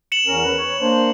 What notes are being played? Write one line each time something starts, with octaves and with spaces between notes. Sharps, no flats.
C#7 E7 F#7
E2 C#4 A#4
B4
C#5
A#3 D4 C5